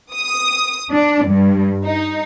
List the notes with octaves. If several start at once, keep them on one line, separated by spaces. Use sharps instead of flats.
D#6
D4
G2
D#4